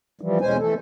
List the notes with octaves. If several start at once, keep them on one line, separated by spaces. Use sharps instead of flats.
E3 F3 G3
E2 B2 G#3 C#4 C5 G#5
E3 A3 A4